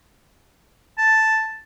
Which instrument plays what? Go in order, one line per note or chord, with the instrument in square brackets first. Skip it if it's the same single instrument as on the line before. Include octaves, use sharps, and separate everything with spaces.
[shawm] A5